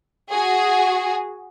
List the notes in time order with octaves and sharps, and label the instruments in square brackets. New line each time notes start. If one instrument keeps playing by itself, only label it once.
[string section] F#4 G#4